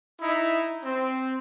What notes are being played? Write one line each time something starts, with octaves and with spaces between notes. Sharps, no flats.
D#4 E4
C4